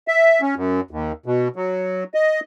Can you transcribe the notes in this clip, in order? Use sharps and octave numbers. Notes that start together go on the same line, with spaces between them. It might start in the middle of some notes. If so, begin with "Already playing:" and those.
E5
C#4
F#2
D#2
B2
F#3
D#5